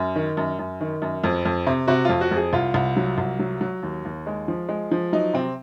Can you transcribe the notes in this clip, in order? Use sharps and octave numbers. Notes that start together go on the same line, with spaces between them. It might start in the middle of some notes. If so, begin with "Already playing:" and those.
Already playing: F#2
D#3
F#2
F#2
D#3
F#2
F2
F2
C3
C3 F#4
F2 F4
F#4
F2
G#4
C2 F4
C2
F#3
C2
F#3
F#3
D#2
D#2
G#3
F3
G#3
F3
F#3 D#4
C3 C4